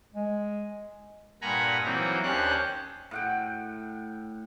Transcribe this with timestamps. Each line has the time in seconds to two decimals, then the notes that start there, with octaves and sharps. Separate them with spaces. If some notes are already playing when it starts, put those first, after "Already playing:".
0.14 G#3
1.42 G2 A#2 F#5 G#5 A#5 B5
1.83 E3 F#3 A#3 C4 D#4
2.23 D#2 C#4 D4 G4 C5 F#6
3.11 A2 F#5 G5